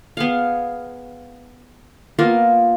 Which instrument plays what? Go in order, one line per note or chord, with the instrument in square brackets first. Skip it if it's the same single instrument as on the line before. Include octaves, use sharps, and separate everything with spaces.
[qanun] B3 G#4 F5
A#3 B3 F4 A#4